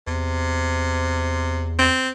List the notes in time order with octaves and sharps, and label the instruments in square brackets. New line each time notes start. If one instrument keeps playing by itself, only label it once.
[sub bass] E2 [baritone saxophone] C3
[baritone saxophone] C4